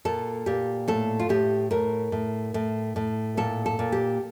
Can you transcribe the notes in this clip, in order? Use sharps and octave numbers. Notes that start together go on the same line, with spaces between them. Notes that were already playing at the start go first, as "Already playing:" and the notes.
A#2 A4
A#2 G4
A2 A4
F4
A2 G4
A2 A#4
A2
A2
A2
A#2 A4
A4
A#2
G4